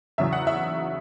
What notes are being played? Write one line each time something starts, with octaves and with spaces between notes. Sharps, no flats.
E2 C#3 F#3 E5
F#5
E5